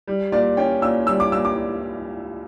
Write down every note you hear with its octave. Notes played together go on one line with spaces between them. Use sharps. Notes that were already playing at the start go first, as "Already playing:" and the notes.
G3
A#2 D5
C#4 G5
A#2 E6
G3 E6
D6
A#2 E6
D6